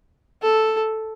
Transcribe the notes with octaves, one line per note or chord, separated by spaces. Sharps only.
A4